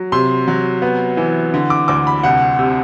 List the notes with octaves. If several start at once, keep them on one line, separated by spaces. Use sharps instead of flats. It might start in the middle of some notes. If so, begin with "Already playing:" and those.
Already playing: F#3
C3 C6
F#3
B3
E3
D3
D6
D2 D6
B5
C2 F#5
C3